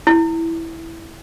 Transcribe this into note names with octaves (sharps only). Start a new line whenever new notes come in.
E4